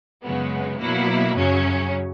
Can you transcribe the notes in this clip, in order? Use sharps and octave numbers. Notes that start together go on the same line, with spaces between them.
F#2 C#3 G#3 B3
B2 F#3 A#3 E4
F#2 C#3 F#3 C#4